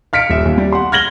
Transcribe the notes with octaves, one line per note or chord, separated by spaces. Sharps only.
F5 F6 B6 C#7 D7
D#1 E5
D#2
G3
F#5 C6
F6 G#6 A#6 F#7 G7